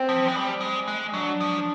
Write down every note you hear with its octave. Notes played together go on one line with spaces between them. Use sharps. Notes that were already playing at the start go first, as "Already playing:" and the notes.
Already playing: C4
F3
G#3
G3
G#3
G#3
F#3 D4
F3